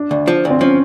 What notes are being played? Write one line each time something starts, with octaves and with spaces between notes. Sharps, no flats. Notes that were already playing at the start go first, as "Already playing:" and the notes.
Already playing: D4
D2
F3
D2
C4
F3 C#4